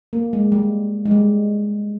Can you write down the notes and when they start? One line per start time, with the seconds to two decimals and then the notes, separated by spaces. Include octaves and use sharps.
0.13 A#3
0.33 G#3
0.52 G3
1.05 G#3
1.11 G3